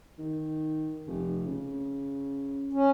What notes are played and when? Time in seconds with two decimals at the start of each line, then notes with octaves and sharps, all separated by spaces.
0.19 D#3
1.07 F1
1.45 C#3
2.73 C#4